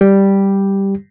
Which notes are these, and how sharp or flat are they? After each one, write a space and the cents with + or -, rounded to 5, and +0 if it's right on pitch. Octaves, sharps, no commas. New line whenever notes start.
G3 +0 G4 +0